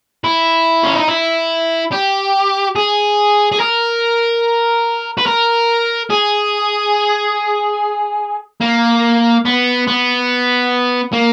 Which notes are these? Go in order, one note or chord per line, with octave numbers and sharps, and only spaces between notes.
E4
C#4
D#4
E4
G4
G#4
G#4
A#4
B4
A#4
G#4
A#3
B3
B3
A#3